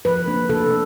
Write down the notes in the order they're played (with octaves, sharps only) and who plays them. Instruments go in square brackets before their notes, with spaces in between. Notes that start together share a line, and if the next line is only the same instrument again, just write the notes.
[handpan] F3 B4
A#3 D4
C3 A4